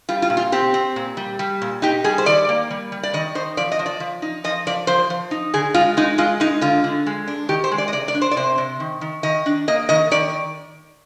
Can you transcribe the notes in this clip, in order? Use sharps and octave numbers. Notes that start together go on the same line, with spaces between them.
G3 F4
F4
A#2
F4
C4 G4
C4
A#2
G3
G3
A#2
D#4 G4
G3 G#4
C5
D#3 D5
A#3
G3
G3
D5
D#3 D#5
D#4 C5
F3 D5
D#5
F3
D5
F3
D#4
F3 D#5
F3 D5
F3 C5
F3
D#4
D3 G#4
G#3 F4
G#3 D#4
G#3 F4
G#3 D#4
D3 F4
D3
G#3
D4
D#3 G4
C5
G#3
D5
D#5
C3 D5
D5
D4
C5
D5
C3 C5
C3
D#3
D#3
D#3 D#5
D4
A#3 D#5
D#3 D#5
D#3 D5